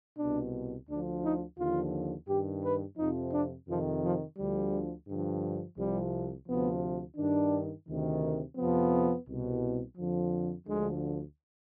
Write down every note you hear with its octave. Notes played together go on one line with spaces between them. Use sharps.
C2 B2 D4
D2 D3 F3 D4
D#4
D#2 D3 F3 F4
G2 D#3 G4
B4
F2 C3 F3 D#4
D4
F2 C3 D#3 F3
F3
D2 D3 F3 G3
G2 D3 F3
C2 C3 F3 G3
D2 C3 F3 B3
G2 D#3 D4
D2 C3 D#3
F2 C3 F3 B3
C2 B2
F2 D3 F3
D2 D3 F3 G#3